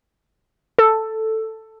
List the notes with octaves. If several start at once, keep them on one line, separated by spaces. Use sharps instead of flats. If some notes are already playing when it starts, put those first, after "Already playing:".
A4